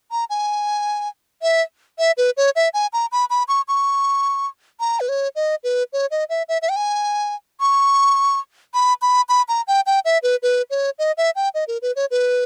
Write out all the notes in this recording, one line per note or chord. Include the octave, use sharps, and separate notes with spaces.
A#5
G#5
E5
E5
B4
C#5
E5
G#5
A#5
B5
B5
C#6
C#6
A#5
B4
C#5
D#5
B4
C#5
D#5
E5
E5
E5
G5
G#5
C#6
B5
B5
B5
A#5
G5
G5
E5
B4
B4
C#5
D#5
E5
G5
D#5
A#4
B4
C#5
B4